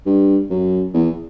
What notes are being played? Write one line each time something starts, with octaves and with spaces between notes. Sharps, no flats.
G2
F#2
E2